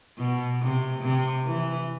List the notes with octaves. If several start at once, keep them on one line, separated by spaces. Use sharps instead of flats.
B2
C3
C3
E3